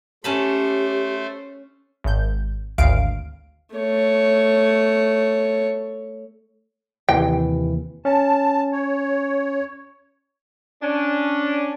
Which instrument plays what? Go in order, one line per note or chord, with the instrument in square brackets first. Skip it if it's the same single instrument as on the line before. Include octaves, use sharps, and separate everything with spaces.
[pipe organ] A3 C5 [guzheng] C#4 A5 B5 [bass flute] G4
[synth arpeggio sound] G#1 G6
G#1 D2 F5 D7
[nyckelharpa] A3 C#5
[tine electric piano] D#2 C3 E3 [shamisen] G5
[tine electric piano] C#4 [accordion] A5
[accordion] C#5
[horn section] C#4 D4